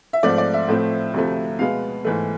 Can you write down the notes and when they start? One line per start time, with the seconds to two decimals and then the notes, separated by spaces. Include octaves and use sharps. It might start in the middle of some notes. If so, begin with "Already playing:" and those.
0.13 E5
0.23 G#2 F3 A3 C4 D5
0.38 D5
0.54 E5
0.68 A2 F3 A3 C4
1.14 D2 C3 F3 A3
1.59 B2 G#3 B3 F5
2.05 G#2 E3 A3